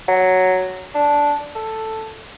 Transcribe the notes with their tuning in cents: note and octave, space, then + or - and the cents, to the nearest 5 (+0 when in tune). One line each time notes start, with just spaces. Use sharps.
F#3 +0
D4 -10
A4 +5